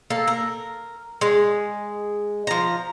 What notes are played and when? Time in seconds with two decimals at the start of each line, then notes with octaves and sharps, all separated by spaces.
0.10 A#3 A4
0.28 A#4
1.21 G#3
2.47 F3 A#5